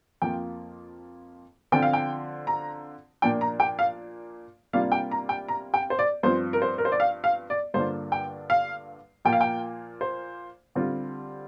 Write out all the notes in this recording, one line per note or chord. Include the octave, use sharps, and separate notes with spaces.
F2 F3 A#3 F4 G5
D3 F3 C4 F4 G5
F5
G5
A#5
A#2 F3 A#3 D4 G5
A#5
G5
F5
C3 G3 A#3 D4 F4 F5
G5
A#5
G5
A#5
G5
C5
D5
G2 F3 C4 C5
A#4
C5
A#4
C5
D5
F5
F5
D5
G2 D3 A#3 D4 F4 C5
G5
F5
A#2 F3 A#3 F4 G5
F5
G5
C5
D3 G3 C4 F4